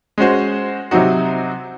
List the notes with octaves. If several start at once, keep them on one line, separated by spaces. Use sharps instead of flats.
G#3 C#4 F#4 C5
C3 F#3 C4 D#4 F#4